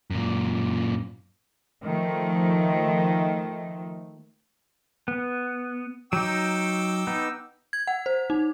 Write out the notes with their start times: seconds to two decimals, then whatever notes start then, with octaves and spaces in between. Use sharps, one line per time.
0.10 F#2 A#2
1.82 D#3 F3 A3
5.08 B3
6.13 F#3 D#4 G5 D6 E6
7.07 B3 D#4
7.73 G#6
7.87 F#5
8.06 C5
8.30 D#4